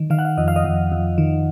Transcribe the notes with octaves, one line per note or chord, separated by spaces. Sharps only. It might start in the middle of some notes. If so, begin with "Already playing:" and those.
Already playing: D#3
D#3 F5
F#5
F5
F2 D#5
F5
D#5
F2
F2
D#3